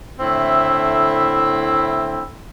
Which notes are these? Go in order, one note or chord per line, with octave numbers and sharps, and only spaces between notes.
A2 D3 C4 E4 E5